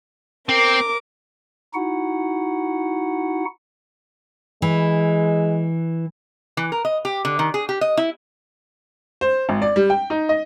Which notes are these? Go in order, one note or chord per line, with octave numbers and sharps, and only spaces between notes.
C4 A#4 D6
D#4 E4 F#4 F#5
E3 G#3
E3
A#4
D#5
G4
D3
D#3
G#4
G4
D#5
E4
C5
G#1
D5
G3
G5
D#4
D#5